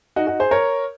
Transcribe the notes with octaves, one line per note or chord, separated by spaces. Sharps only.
D#4 F#4
D#4 F#4
G#4 C5
A#4 C#5